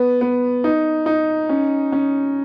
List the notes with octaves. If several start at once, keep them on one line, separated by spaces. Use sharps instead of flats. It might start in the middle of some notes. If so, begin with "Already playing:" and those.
Already playing: B3
B3
D#4
D#4
C#4
C#4